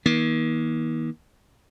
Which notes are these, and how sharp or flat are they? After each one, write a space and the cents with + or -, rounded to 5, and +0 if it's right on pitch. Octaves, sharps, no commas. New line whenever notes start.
D#3 +40 A#3 +40